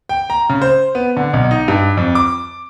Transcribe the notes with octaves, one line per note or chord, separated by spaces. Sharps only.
G5
A#5
C#3
C5
B3
D3
B1
D#4
G2
F2
D6